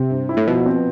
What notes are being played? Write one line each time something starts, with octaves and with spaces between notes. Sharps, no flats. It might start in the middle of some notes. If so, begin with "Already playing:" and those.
Already playing: C3 C4
G2
E4
A2
B2 F3
C4